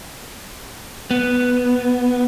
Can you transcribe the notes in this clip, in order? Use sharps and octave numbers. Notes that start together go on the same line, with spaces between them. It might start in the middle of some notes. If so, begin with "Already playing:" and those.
B3